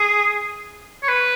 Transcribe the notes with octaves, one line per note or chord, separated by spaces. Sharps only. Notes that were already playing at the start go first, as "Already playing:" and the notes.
Already playing: G#4
C#5
B4